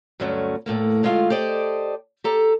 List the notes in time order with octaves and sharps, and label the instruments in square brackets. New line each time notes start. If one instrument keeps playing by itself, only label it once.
[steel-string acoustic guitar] D2 G2 F#3 A3 C#4
E2 A2 A3 A#3
D3 G#3 A3 F4 F5
G4 A4 C5 D5 D#5
G4 A4 A#5